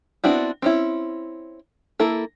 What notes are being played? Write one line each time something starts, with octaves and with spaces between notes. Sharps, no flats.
B3 C4 D4 E4 F#4
C4 C#4 E4
A#3 E4 A4